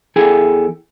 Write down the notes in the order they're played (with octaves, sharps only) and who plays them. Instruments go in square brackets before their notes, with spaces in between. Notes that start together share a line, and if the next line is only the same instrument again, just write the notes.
[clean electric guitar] E2 E4 G#4 A4 G5 G#5